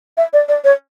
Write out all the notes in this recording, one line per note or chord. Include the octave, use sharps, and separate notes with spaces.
E5
D5
D5
C#5